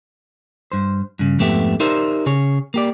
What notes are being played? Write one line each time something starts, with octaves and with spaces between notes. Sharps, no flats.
G2 C5
G2 C#3
F2 G#2 A3 B3 G4 E5
D#4 G4 A#4 C5 D5 E5
C#3 G#4 C#5
A#3 G4 D5